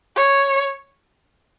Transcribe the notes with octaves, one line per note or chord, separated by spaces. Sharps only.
C#5